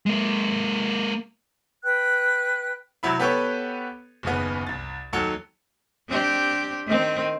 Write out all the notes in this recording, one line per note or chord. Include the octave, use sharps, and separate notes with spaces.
G#3 A#3
B4 G5 F#6
C3 F#3 E4 B5
B3 G4 A4 B4 C#5
F#1 D#2 C#3 B3
C2 A6
D#2 D#3 F#3 A4 C#7
C4 D4 G4
D#3 C4